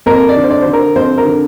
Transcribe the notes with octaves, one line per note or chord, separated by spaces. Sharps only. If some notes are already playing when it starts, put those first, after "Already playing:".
F2 A#4
D5
D3
C5
D5
D3 C5
A#4
F2 C5
A#4
D3